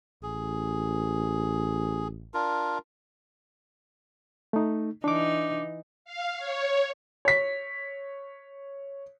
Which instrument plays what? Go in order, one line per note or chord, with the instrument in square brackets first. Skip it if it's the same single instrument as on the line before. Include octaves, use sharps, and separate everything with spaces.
[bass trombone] A1 [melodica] G#4
[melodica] D4 F4 A#4
[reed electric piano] A3 D#4
[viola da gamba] E3 D#4 [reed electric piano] D4 D6
[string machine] F5
C#5
[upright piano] C#5 B6